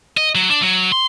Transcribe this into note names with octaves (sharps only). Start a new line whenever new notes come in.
D#5
F#3
D4
F#3
C6